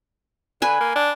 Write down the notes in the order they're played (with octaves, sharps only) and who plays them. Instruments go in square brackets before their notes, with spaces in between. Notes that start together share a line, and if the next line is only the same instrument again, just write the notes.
[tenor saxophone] D3 [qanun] B4 G#5
[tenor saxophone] A#3
D4